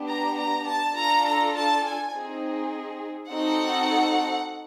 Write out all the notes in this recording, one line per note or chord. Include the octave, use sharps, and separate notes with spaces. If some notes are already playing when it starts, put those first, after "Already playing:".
Already playing: B3 D4 G4
A#5
A#5
A5
D4 F4 A4 A#5
A#5
A5
G#5
C4 D#4 G#4
C4 D#4 F#4 A4 F#5